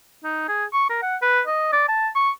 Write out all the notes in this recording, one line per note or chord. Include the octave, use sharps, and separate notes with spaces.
D#4
G#4
C#6
A#4
F#5
B4
D#5
D5
A5
C#6